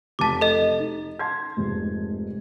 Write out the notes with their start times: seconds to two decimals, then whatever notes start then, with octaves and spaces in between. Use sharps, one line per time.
0.19 F1 A5 D6 A6 B6
0.41 A4 D#5
0.80 D#4
1.19 A5 C6 G#6
1.57 F1 G#2